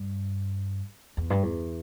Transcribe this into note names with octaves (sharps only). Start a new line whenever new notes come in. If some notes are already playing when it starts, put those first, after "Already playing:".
Already playing: G2
E2
G2
E2